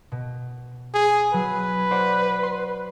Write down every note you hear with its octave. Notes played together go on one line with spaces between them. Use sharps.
B2
G#4
F#3 B4
C5 D5 F#5
C6